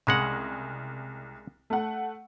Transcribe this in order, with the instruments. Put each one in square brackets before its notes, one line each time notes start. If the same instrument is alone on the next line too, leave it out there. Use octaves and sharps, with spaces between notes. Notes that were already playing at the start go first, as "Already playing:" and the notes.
[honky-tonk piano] C2 [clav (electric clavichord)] C#3 G#3 F#5
[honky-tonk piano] A3 F#5